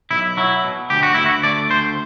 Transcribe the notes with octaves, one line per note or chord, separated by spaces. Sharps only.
B1 E4
F#3 E4
B2
D2 G4
F#4
D2 E4
F#4
A3 D5
D2 C5